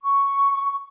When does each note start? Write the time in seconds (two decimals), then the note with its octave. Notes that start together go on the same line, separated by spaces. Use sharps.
0.02 C#6